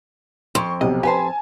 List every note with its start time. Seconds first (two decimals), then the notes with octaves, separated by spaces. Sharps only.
0.55 F2 C6 C#6
0.81 B1 C3 D#5
1.03 G4 B4 C5 G#5 A5